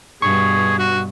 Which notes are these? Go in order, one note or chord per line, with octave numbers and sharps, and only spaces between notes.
G2 B2 G#4 C#6
F#4